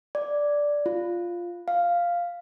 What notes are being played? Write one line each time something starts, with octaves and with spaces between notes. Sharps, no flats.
D5
F4
F5